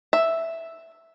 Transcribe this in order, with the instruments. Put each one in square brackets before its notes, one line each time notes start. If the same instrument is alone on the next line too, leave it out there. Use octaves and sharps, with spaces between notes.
[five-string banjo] E5